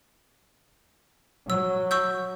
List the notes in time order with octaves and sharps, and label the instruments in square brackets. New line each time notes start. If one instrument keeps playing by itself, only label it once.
[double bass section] F#3 [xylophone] E6
[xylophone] C#6 E6 G6